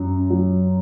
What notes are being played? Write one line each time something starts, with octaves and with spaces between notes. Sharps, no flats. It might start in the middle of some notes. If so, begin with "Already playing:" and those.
Already playing: F#2 F#3
F#3